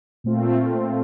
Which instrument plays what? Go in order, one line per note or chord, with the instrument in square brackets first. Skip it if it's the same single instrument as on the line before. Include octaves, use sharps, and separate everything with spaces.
[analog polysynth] A#2 A3 C4 F4